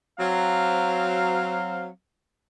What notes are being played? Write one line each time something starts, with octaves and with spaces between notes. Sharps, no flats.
F#3 C4 F5